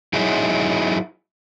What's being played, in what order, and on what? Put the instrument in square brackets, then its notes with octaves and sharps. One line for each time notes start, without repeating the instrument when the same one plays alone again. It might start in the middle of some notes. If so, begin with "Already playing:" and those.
[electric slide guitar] F#3 D#4 E4 G#4